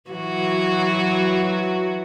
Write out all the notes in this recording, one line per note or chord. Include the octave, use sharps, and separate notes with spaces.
E3 F#3 F#4